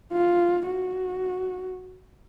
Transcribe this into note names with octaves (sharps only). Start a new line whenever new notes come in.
F4
F#4